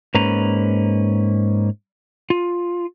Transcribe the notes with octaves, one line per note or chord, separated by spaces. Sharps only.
G#2 A#3 C#4 B4 A#5
F4